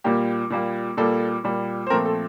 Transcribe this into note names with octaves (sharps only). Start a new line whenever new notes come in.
A#2 G3 A#3 G4
A#2 G3 A#3
A#2 G3 A#3 A4
A#2 G3 A#3
C5
A#2 F3 A3 C4 A#4
A4